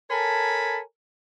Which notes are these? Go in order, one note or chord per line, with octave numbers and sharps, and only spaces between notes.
A4 A#4 C#5 G#5 A5 B5